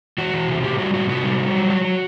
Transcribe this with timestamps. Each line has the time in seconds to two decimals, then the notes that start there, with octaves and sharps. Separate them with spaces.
0.18 E3 F#4
0.33 E3
0.48 C3
0.63 A2 G4
0.79 G3 F#4
0.94 A2 F#4
1.09 C3 F#4
1.24 G3
1.39 G3
1.55 F#3
1.70 F#3
1.84 F#3